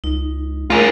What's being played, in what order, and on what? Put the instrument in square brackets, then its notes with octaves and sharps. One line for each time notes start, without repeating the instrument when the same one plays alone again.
[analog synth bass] C#2 [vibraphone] D#4
[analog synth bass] A3 [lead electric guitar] F4 G#4 [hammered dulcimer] A#4 D5 F#5